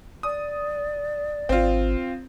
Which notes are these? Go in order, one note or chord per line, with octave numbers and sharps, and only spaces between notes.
D5 D#6
G#1 C4 F4